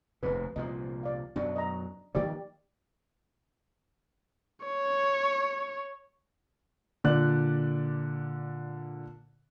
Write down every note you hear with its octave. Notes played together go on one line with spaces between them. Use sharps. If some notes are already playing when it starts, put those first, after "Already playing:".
F1 D#2 G#2 B4
C2 A#2 F3 D#5
D5 F5
F#2 B2 F#3 D4
D#5 A#5
D#3 F3 G3 A#3 G4 D5
C#5
A#2 D3 D5 F#6